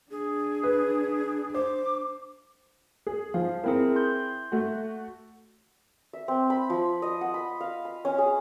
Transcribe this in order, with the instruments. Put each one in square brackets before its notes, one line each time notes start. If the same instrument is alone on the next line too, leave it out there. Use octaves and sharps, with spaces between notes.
[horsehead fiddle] D4 [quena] G#4
[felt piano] B4
[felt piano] C5 [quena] D6
[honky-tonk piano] G#4
[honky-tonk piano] F3 [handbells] C5 F5
[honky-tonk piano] C4 E4 [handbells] G#4 A#4
[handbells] C6 G6
[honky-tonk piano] A3 F#4
[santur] E5
C4
B5
F3
D#5
F#5
B5
F5
B5
C#4
G#4